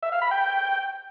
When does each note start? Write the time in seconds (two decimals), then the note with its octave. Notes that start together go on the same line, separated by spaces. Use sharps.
0.03 E5
0.12 F5
0.22 B5
0.31 G5